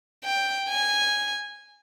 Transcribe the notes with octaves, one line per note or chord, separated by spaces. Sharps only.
G5
G#5